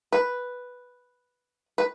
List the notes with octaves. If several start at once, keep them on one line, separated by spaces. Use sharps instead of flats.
B4
B4